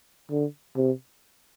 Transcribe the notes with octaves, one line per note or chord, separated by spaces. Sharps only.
D3
C3